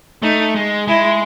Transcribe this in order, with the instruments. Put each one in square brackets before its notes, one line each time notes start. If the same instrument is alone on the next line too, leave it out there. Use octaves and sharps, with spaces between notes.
[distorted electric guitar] A3 [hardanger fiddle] D#4
[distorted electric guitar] G#3
[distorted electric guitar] G#3 [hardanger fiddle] E4